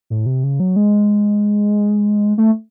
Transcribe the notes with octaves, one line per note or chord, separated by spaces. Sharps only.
A2
C3
C#3
F#3
G#3
A3